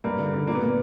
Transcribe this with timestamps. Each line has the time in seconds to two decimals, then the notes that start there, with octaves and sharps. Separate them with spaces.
0.04 G2 A#3
0.19 D3
0.34 D3
0.47 A#2 A#3
0.55 B3
0.62 A#2 A#3